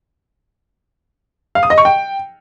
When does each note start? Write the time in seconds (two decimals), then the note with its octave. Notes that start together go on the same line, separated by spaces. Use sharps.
1.55 F5
1.63 D#6
1.70 D#5
1.78 C#6
1.85 G5